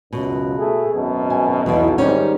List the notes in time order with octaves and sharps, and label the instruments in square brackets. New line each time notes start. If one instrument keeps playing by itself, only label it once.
[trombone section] C#2 F#2 [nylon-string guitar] B2
[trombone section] A3 G#4
G#1 F#2 B2
[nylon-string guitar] G#5
[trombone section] B1 B2 [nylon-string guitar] E2 E3 E4
[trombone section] G#2 D#3 G3 [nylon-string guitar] C#4 D#4